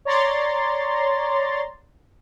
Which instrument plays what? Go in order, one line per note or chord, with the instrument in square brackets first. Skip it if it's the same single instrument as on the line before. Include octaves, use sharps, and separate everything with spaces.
[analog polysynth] C#5 D5 A#5 C6 A6